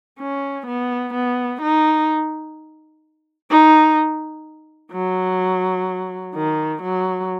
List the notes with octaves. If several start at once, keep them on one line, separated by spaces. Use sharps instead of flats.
C#4
B3
B3
D#4
D#4
F#3
D#3
F#3